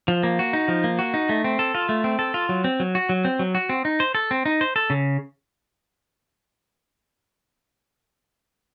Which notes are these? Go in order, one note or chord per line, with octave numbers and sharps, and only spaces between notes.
F3
A#3
F#4
D#4
F3
A#3
F#4
D#4
A3
C4
A4
F4
A3
C4
A4
F4
F#3
C4
F#3
F#4
F#3
C4
F#3
F#4
C4
D#4
C5
A4
C4
D#4
C5
A4
C#3